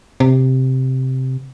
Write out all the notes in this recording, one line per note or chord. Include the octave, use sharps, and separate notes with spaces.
C3